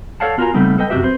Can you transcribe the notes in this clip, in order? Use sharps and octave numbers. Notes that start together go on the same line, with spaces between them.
A4 C#5 D5 F5 F#5 A5
B3 F4 F#4 A#4 G#5 A#5
C#3 G3 A3 B3 C4 D#4
A4 B4 D#5 G5
F#2 C3 B3 F#4 G4 E5
C4 B4 C5